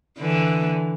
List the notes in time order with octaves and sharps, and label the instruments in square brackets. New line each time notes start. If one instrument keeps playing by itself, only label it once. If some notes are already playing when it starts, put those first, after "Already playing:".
[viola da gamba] D3 E3